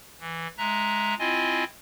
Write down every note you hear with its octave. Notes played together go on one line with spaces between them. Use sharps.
E3
G#3 E5 A#5 F#6
C4 E4 F4 D#5 G#5